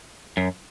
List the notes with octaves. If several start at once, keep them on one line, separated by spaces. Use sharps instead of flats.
F#2